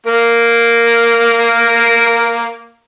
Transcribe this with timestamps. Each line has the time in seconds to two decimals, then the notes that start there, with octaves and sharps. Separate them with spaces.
0.06 A#3 A#4